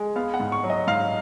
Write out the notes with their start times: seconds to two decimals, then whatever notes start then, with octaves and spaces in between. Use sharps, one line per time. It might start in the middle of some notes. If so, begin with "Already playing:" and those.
Already playing: G#3
0.16 B3 F5
0.34 F#5
0.40 G#2
0.52 C#6
0.64 F#3
0.70 D#5
0.87 G#2 F5